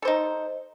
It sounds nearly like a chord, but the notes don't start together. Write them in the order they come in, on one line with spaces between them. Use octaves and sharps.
A4 C5 D#4